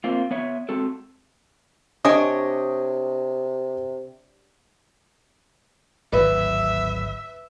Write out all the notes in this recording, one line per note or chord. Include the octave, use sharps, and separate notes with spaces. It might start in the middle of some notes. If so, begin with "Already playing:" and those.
A#3 C4 F4
B3 C#5 E5
G#3 C4 F#4 A4
C3 D4 G4 C#5 D#5 G#5
D1 G#1 F#3 B4 E5